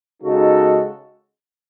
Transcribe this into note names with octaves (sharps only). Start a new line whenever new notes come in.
C#3 G#3 D#4 F#4 A4